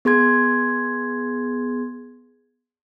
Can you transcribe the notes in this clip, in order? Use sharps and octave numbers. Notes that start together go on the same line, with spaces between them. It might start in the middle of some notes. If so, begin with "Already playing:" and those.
B3 G#4 C6 G#6